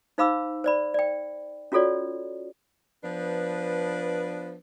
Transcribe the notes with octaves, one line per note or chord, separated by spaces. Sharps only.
D#4 C5 F5 B5 D6 E6
C5 D5 B5
D5 G5
C#4 F4 F#4 A4 C#5 D5
F3 B3 D4 B4